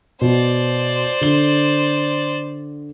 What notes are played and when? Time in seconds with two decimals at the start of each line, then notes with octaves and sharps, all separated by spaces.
0.21 B2 C5 D5
1.21 D3 G7